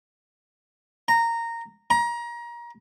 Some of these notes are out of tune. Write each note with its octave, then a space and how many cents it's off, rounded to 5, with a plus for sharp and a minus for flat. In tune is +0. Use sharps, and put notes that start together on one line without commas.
A#5 -10
A#5 +30